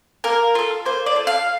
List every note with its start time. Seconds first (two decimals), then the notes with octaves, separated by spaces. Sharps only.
0.24 A#3 A#4
0.55 F4 A4
0.85 A#3 C5
1.06 D5
1.16 F4 A4
1.27 F5